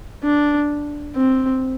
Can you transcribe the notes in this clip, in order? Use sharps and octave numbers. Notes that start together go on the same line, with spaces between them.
D4
C4